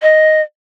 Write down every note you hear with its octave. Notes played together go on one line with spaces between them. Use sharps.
D#5